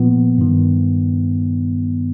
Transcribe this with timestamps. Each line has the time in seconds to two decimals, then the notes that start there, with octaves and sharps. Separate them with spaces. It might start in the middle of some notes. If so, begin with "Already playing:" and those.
Already playing: A#2 F3 B3
0.38 G2 D#3